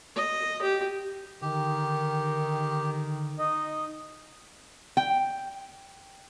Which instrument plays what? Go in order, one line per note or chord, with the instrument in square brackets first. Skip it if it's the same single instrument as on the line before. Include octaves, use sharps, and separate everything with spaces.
[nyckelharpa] D#5
G4
[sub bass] D3 [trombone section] D#3 [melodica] G4
[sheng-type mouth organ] D#4 D#5
[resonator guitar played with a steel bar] G5